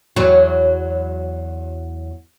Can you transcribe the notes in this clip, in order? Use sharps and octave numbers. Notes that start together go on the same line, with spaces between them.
E2 F#3